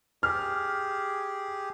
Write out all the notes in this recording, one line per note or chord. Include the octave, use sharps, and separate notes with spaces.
G4 G#4 F6